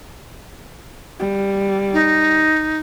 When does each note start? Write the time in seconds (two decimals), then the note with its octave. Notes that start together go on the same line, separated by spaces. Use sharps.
1.19 G3
1.93 D#4